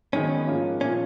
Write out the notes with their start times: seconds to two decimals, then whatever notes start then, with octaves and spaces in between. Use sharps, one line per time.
0.13 F#2 D#3 G#3 B3 C#4 D#4
0.47 G#2 F3 A#3
0.81 A#2 F3 A#3 C#4